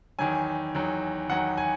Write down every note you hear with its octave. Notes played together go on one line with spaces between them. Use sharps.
E2 D#3 F#3 G#5
E2 D#3 F#3
E2 D#3 F#3 F#5
G#5